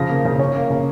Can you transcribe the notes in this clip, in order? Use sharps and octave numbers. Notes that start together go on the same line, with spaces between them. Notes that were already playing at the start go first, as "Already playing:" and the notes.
Already playing: C#3 F3 A#6
A#3
C#3
C#4
A#3
C#3